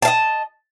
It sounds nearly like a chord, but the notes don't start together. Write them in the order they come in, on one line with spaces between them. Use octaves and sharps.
A5 F5 D#5